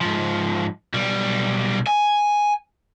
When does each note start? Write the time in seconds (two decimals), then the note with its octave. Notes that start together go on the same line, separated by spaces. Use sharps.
0.01 G#2 F3
0.94 B1 G3
1.87 G#5